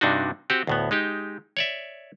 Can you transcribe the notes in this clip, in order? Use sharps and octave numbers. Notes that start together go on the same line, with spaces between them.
G2 C3 D4 D#4 F#4
C4 F#4 G4
D2 A2 B3
G#3 D#4 G4
C#5 D5 E5